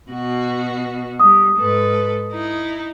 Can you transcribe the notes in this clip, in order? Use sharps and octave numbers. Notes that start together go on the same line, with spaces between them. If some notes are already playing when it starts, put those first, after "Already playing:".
B2 F#4
G3 D#6
G#2 A4 B4
D#4 E4